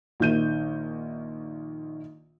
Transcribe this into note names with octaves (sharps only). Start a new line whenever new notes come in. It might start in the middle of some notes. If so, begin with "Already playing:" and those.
A#1 D#3 G6 D#7